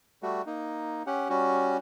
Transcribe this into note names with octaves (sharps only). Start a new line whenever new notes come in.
G3 A3 F#4
A#3 D#4
C#4 G4 F#5
G3 C#4 F#4